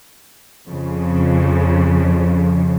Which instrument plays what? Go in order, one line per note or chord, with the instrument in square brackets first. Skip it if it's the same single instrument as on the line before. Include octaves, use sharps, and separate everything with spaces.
[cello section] F2 C#3